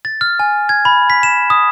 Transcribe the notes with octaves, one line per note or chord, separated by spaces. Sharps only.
A6
F6
G#5
G#6
B5
B6
E7
D#6